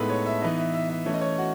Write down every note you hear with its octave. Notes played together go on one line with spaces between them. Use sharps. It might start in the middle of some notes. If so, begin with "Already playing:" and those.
Already playing: A2 G#3 B3 D#4 A4 B4
C#5
E5
E3 B3 D#4
E5
E5
E5
E3 A3 C#4 C#5
D#5
C#5
F#4